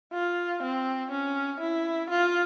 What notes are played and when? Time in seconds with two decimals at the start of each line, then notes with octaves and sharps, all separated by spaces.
0.13 F4
0.63 C4
1.11 C#4
1.60 E4
2.10 F4